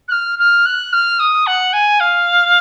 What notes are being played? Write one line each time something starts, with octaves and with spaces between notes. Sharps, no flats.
F#6
F6
F6
F#6
F6
D#6
F#5
G#5
F5